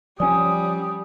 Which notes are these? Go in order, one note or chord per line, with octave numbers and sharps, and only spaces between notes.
F3 G3 C#4 D5 G#5 D#6